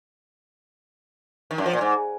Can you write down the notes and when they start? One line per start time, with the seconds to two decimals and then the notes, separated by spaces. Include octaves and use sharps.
1.51 D#3
1.58 F#2
1.66 F3
1.73 A#2
1.81 G#2